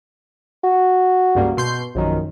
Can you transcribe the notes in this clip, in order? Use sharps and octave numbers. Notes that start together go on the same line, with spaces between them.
F#4
C#2 G2 A#3
B2 C6 G6
A#1 F#2 D#3